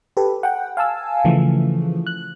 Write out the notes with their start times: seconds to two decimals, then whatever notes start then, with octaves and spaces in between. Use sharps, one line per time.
0.17 G4 A4 B4
0.43 F#5 G5
0.77 F5 G#5 A5 E6
1.25 C#3 E3 F3 A3
2.07 F#6